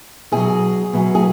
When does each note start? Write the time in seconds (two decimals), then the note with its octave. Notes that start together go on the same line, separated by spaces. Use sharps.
0.32 B2 F#3 G#4
0.93 B2 F#3
1.15 G#4